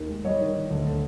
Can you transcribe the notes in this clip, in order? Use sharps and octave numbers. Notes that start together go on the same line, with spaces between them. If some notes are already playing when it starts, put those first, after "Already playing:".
Already playing: D#2 D#3
G#3
G3 C#5 D#5
D#3
D#3
D2
D3